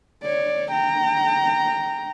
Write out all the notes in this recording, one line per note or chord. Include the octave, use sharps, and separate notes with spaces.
C#5 D5
G5 A#5